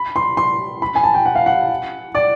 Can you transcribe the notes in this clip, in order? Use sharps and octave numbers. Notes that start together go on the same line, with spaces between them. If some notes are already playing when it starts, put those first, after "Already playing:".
Already playing: B5
C6
C6
B5
G#5
A5
G5
F#5
F5
F#5
D5